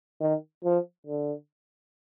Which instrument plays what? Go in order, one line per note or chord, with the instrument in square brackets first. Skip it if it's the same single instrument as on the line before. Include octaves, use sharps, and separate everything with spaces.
[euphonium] D#3
F3
D3